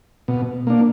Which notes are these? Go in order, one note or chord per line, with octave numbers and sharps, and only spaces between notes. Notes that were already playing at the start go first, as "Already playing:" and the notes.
B2
A#3 D4